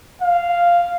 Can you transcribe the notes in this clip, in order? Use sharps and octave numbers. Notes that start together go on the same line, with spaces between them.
F5